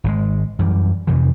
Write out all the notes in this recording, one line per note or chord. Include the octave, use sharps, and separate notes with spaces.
G#1 B2 G#3
F#2 E3 G3
F2 C3 D#3 E3